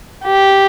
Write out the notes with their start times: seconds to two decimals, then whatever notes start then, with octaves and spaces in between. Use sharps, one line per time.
0.25 G4